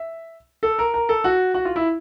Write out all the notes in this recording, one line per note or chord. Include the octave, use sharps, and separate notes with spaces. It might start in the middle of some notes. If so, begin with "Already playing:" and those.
Already playing: E5
A4
A#4
A#4
A4
F#4
F#4
F4
E4